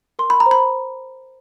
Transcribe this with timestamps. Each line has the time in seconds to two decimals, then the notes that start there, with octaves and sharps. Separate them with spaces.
0.19 A#4 C6
0.30 B5
0.40 A#5
0.46 C5
0.51 B5
0.72 C5